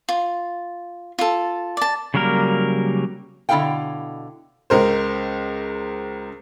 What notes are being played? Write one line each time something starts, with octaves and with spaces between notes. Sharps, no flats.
F4
F4 A4
D5 A5
C#3 F#3 G3 A#3 A#4
B2 D3 E4 G#4 F5 G5
C#2 A#4 C5